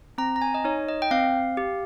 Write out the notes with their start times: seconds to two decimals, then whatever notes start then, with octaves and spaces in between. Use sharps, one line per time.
0.18 C4 A#5
0.36 A#5
0.42 G#5
0.54 D#5
0.64 D#4 C#5
0.89 D#5
1.02 G5
1.11 C4 F5
1.57 G4